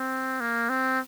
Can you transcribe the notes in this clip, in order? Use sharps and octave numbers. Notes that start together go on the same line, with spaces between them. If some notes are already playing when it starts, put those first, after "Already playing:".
Already playing: C4
A#3
C4